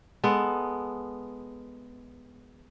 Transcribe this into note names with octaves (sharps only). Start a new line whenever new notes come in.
G#3 B3 A4